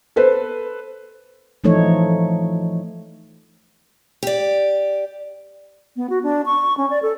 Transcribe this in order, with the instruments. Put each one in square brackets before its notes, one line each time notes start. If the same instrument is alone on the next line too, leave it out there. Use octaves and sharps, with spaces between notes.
[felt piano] A4 B4 C5
[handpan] E3 F3 A3 D#4 A4 C#5
[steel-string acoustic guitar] G4 D5
[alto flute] B3
F#4
D4
C#6
C#4
D5
A4